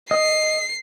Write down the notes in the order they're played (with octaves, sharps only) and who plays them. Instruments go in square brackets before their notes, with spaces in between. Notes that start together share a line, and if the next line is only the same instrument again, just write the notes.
[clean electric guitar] D#5 [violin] C7